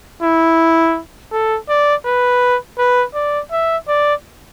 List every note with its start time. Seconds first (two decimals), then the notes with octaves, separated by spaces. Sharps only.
0.23 E4
1.32 A4
1.69 D5
2.05 B4
2.79 B4
3.15 D5
3.51 E5
3.88 D5